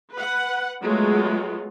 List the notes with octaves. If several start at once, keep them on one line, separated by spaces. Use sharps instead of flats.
B4 F#5
F#3 G#3 A3 B3 F4